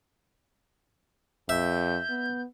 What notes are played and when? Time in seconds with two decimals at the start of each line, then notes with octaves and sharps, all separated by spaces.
1.49 F2 E5 G6
2.09 B3